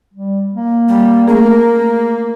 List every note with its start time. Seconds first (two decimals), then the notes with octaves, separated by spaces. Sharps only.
0.14 G3
0.55 A#3
0.88 G3
1.28 A3 A#3 C#4 G#4 A#4